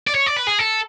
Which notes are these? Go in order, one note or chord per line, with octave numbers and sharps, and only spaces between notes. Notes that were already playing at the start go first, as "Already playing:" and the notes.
D5
C#5
D5
B4
G#4
A4